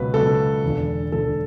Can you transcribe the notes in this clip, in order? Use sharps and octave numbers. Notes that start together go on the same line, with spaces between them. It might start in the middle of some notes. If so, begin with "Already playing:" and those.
Already playing: C#2 B2 F#3 B4
C#2 B2 F#3 A4
E1 E2 D3
E1 E2 D3 A4